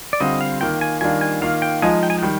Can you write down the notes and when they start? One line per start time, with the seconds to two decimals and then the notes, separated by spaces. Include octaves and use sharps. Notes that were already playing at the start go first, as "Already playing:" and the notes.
0.13 D5
0.20 D3 G3 C4 F4 D#5
0.41 F5
0.61 D#3 A#3 F4 G5
0.81 G#5
1.01 D#3 G3 A#3 D4 F4 G#5
1.21 G#5
1.42 D#3 A#3 F4 F5
1.62 G5
1.82 F3 G#3 D#4 G#5
2.03 G5
2.10 G#5
2.19 D#3 G3 G5